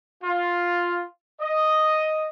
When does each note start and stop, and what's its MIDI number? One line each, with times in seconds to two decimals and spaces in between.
0.23 1.03 65
1.41 2.27 75